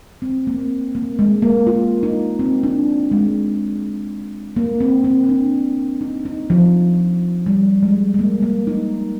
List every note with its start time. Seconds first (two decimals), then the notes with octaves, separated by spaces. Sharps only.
0.22 C4
0.47 A#3
0.59 C4
0.95 A#3
1.19 G#3
1.42 A#3
1.67 F4
2.03 D#4
2.39 C4
2.63 D4
3.11 G#3
4.56 A#3
4.81 C4
5.04 C4
5.24 C4
5.29 D4
6.01 D#4
6.25 D#4
6.50 F3
7.46 G3
7.83 G#3
8.14 G#3
8.19 A#3
8.43 A#3
8.67 D#4